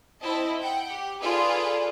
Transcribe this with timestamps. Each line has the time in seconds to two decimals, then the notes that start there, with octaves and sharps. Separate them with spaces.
0.20 C4 E4 D#5 A5
0.60 F#5 G5
0.90 G4
1.22 F4 G#4 A4 B4 D5